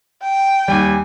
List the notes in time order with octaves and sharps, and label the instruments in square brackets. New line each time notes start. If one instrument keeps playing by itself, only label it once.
[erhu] G5
[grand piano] D#2 G3 [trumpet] G#5